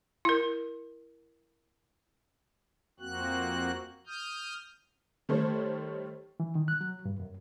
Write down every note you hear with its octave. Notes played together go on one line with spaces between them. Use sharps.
E4 A#4
F2 A#3 C4 F#4 F#6
D#6 F6 G6
D#3 G3 A3 A4 C5 C#5
E3
D#3
F#6
F#3
G2
F#2